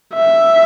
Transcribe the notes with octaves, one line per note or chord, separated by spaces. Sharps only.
E5